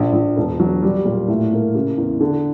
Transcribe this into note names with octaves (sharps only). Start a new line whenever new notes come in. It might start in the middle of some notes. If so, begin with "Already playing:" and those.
Already playing: A#1
A#1
E1
F#3
G3
A#2
A2
A#3
C#3
E2
D3